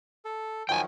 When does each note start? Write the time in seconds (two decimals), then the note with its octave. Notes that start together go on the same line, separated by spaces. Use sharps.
0.25 A4
0.69 D#3 F3 F#3 G5 G#5